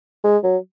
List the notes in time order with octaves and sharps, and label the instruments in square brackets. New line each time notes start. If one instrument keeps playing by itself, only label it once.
[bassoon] G#3
F#3